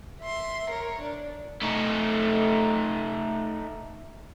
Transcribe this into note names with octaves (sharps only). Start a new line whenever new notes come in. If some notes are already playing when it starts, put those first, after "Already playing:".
E5 C6
A#4 C#5
D4
A3 D#4